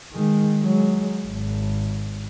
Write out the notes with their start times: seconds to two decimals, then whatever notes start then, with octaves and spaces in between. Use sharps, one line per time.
0.12 D#3 G#3
0.62 F#3 G#3
1.25 G#1